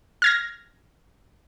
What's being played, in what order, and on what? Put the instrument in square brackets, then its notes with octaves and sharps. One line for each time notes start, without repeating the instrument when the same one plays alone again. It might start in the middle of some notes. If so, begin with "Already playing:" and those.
[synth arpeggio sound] F6 G#6 A#6